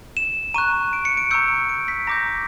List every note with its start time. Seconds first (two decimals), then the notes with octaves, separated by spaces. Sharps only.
0.17 E7
0.54 A#5 C#6 F#6 D#7
0.93 D7
1.05 C#7
1.17 D7
1.31 A#5 C#6 E6 G6 C#7
1.69 D7
1.88 B6
2.07 A#5 D6 G6 A#6